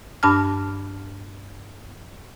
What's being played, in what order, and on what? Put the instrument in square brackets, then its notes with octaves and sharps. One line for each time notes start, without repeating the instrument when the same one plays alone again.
[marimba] G2 D4 A5 F6